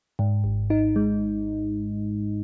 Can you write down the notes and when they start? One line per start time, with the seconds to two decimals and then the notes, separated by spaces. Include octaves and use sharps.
0.19 G#2
0.44 G#1
0.70 D#4
0.96 G#3